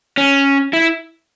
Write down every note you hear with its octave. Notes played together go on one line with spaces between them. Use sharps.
C#4
E4